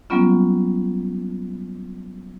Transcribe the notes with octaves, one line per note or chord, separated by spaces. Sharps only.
F#3 G3 A#3 B3 C#4 F4